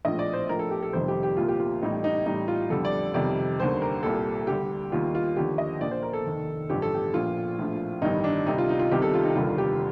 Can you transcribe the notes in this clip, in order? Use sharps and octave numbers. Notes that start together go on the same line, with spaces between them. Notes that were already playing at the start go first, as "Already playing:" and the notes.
A#1 A2 F3 D#5
D5
C5
A#1 A2 F3 A#4
A4
G4
A4
F1 F2 C3 D#3 G3 C5
G4
G4
C2 A#2 F3 F4
G4
F4
A1 A2 G3 D#4
D#4
A1 A2 G3 D#4
F4
F2 D3 G3 A4
D5
F2 C3 D#3 G3 D5
D#2 D3 G3 C5
A#4
C2 A#2 G3 A4
D2 D3 G3 G4
D#2 D#3 G3 F4
F4
D#2 D3 F3 G4
D#5
A#1 A#2 F3 D5
C5
A#4
A4
F1 D#2 D#3
A1 G2 D3 F3 G4
A4
G4
A#1 A#2 F3 F4
A#1 A2 F3
A1 G2 D#3 G3 D#4
D4
D2 C3 G3 D#4
F4
D#4
F4
C2 C3 D#3 G3 G4
A4
F4
D#4
F1 D#2 D3 G3 F4
G4